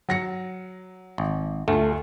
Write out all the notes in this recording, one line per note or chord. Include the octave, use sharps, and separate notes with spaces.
F#3 A#6 C#7
G#1
D2 A3 F4